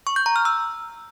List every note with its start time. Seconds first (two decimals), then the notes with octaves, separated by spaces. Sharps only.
0.07 C#6
0.16 G6
0.26 A#5
0.36 F6
0.45 E6